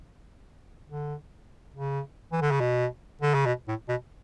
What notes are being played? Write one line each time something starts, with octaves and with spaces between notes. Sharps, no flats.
D3
C#3
E3
D3
C#3
B2
D3
C#3
B2
A2
B2